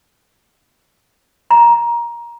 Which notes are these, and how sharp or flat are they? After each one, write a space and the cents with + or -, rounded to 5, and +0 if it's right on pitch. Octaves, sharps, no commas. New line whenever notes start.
A#5 +15